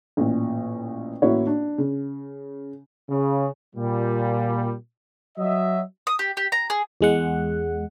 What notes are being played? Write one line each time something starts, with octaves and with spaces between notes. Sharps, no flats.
A1 A#2
A1 A#3 E4 F#4 C#5
D4
C#3
C#3
A#2 G3
F#3 D#5 E5
D#6
G4
G4
A#5
G#4
E2 G#3 F#5